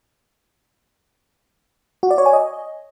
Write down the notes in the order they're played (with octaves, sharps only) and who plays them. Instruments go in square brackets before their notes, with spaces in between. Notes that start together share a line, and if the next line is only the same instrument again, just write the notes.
[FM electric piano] F#4
D5
C#5
G#5
D#5